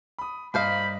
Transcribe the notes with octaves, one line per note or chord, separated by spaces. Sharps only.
B5 D#6
G2 A#3 C5 D#5 F5 B5